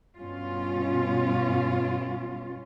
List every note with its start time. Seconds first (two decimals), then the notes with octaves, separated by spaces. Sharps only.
0.17 G2 B2 C#4 F4